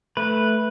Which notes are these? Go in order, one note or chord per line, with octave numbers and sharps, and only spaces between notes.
A3 B4